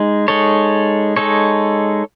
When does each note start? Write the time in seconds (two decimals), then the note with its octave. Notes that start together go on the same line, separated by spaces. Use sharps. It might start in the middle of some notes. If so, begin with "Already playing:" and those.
Already playing: G#3 D#4
0.28 G#3 D#4 A4 C#5
1.16 G#3 D#4 A4 C#5